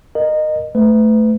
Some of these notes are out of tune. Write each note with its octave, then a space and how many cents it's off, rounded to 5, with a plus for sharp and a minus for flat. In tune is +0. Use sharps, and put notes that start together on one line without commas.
A#4 +0 D#5 -20
A3 +0 B4 +30